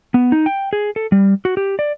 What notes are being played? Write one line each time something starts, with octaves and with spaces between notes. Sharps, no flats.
B3
D#4
G5
G#4
A4
G3
F#4
G4
D5